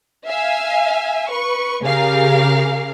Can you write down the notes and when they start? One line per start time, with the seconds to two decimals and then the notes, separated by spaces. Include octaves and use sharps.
0.26 E5 F5 G#5
1.30 B4 C#6
1.83 C#3 G4 G#4 A#4 F5